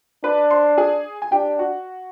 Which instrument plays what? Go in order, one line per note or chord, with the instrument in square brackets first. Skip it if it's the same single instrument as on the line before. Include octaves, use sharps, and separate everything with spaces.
[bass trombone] D4 [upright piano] B4 B5
[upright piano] C5 C6
G#4 G#5
G#5
[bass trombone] D4 [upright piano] G4 G5
[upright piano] F#4 F#5